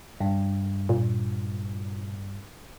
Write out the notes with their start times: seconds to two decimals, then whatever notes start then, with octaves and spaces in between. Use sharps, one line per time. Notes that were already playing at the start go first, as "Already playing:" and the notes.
0.20 G2
0.89 A#2